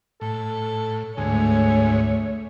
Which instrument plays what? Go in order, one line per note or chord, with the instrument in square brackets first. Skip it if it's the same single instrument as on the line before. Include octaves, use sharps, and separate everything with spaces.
[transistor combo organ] A2 [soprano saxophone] A4
[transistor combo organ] D2 G#2 [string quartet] A3 C#5 [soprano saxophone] G#5